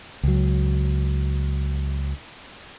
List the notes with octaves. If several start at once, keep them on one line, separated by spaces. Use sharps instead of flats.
C#2 F#3